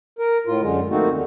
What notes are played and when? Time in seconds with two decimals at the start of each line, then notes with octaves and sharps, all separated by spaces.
0.19 A#4
0.47 A2 F4
0.61 F#2 D3 G#3
0.90 F3 A3 A#3 C4 D#4 F#4
1.11 D#2 D3